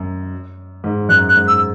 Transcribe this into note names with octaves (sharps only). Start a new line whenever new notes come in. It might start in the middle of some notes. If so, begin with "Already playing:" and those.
Already playing: F#2
G#2
F#2 F#6
F#6
G#2
E6